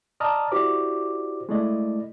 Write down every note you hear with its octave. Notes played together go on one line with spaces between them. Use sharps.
D5 D#5 A5 A#5 D#6 F6
E4 F#4 G4 C5 D5 D6
G#3 A3 E4 D5 D#5